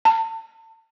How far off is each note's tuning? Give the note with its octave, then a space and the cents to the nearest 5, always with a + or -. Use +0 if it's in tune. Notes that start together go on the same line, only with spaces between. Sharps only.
A5 +35